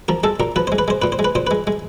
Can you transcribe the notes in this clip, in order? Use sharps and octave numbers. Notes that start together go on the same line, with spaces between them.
F3 A#4
G#3 A4
A#2 A#4
F3 B4
G#3 C5
B4
G#3 C5
A#2 B4
C5
G#3
B4
A#2 C5
G#3 B4
G#3